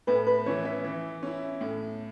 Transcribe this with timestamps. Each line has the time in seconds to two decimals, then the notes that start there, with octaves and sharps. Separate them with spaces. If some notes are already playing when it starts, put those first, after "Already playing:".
0.07 A2 B4
0.27 B4
0.46 E3 C#4 E4 C#5
0.65 E5
0.84 E3
1.23 C#4 E4
1.61 A2